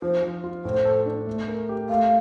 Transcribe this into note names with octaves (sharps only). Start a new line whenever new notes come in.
F3 C5
F3
F4
A2 C5
A4
D4
A3
A#4
G4
A3 F5